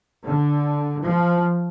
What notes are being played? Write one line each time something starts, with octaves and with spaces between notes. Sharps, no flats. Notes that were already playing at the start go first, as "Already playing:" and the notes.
D3
F3